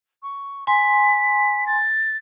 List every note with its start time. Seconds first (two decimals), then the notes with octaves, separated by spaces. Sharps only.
0.23 C#6
0.67 G#5 C6 B6
1.67 A6